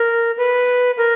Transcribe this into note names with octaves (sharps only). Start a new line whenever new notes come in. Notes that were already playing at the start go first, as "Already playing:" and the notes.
Already playing: A#4
B4
A#4